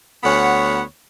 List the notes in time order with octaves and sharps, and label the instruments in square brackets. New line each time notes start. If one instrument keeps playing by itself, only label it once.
[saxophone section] D2 B3 C#5 F#5